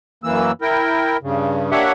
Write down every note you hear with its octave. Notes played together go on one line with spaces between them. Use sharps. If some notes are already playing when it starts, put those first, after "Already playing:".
F#2 E3 A#3 E6
E4 A#4 G5
G2 C#3
A#3 D4 G4 C#5 E5 F#5